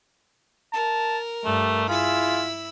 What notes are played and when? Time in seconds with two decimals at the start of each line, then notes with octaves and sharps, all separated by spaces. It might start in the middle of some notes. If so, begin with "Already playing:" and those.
0.73 A#4 A5
1.45 G2 G3 A3
1.89 E4 F4 G#4 B5 E6